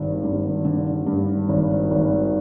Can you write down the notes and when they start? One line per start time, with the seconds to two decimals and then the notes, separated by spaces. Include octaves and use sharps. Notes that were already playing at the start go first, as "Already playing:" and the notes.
Already playing: G#1 G2 D3
0.23 G2
0.65 D3
1.07 G2
1.49 G#1
1.91 G#1